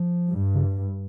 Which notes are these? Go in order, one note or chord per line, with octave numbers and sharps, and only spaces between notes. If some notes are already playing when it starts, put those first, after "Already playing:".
Already playing: F3
G2
C#3